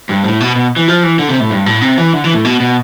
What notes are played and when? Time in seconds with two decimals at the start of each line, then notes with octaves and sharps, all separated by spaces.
0.09 G2
0.24 A2
0.40 B2
0.56 B2
0.76 E3
0.88 F3
1.03 E3
1.19 D3
1.29 C3
1.40 A2
1.50 G2
1.66 A2
1.81 C3
1.98 E3
2.13 D3
2.24 E3
2.34 A2
2.45 B2
2.60 B2